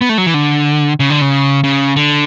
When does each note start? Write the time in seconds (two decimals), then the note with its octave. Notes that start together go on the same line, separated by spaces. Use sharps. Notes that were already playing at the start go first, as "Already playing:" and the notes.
0.01 B3
0.09 A3
0.18 F#3
0.26 E3
0.34 D3
1.00 C#3
1.10 D3
1.21 C#3
1.64 C#3
1.96 D3